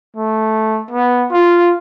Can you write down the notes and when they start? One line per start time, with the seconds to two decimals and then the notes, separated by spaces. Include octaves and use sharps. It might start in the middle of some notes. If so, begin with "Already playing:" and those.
0.17 A3
0.91 B3
1.31 F4